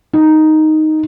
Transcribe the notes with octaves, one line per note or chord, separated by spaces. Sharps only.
D#4